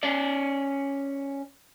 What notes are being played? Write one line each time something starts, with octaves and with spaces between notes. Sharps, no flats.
C#4 D5